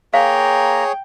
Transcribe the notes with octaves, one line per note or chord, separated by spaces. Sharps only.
A#3 G#4 C#5 F5 G5 A#5